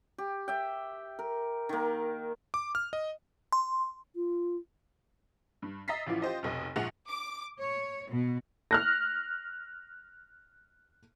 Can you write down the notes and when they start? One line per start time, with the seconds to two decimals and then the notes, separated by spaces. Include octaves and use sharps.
0.18 G4
0.48 E5 G5
1.19 A#4
1.69 D#3 A#3
2.54 D6
2.75 F6
2.93 D#5
3.52 C6
4.14 F4
5.62 G2
5.88 D#5 E5 A#5 A6 B6 C7
6.06 A1 E3 F3 E4 F5 D6
6.22 F4 G4 C5 D#5
6.43 F1 B1 D#5
6.76 A#1 G#2 F3 G#4 F#5 F7
7.08 D6
7.58 C#5
8.07 B2
8.71 F6 F#6 A#6